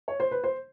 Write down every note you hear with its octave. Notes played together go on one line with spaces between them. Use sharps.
C#5
C5
B4
C5